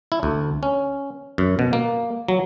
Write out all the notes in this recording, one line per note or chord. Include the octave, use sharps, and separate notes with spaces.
E4
D2
C#4
F#2
B2
A#3
F#3